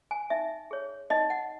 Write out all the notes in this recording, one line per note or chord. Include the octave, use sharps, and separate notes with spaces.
G#5
D#4 E5
G#4 C#5
D#4 D#5
F#5